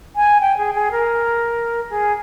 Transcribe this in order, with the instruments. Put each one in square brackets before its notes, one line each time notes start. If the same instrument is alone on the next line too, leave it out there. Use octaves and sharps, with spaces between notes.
[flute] G#5
G5
G#4
G#4
A#4
G#4